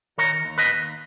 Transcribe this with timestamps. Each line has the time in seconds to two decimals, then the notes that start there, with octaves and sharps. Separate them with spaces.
0.18 D#3 A#4 C#5
0.45 D#2
0.58 B4 D#5
0.72 D#2